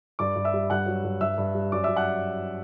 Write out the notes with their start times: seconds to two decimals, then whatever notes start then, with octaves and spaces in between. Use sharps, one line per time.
0.19 G2 D5 D6
0.36 G2
0.44 E5 E6
0.54 G3
0.70 G2 F#5 F#6
0.86 F#3
1.04 G2
1.21 G2 E5 E6
1.38 G2
1.55 G3
1.72 F#2 D5 D6
1.84 F#2 E5 E6
1.96 F#5 F#6